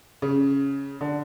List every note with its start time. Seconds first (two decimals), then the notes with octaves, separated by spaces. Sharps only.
0.22 C#3
1.01 D3